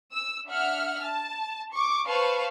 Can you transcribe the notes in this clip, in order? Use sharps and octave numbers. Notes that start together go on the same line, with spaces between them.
E6
D4 E5 F#5 F6
A5
C#6 D6
B4 C5 F5 A5 C#6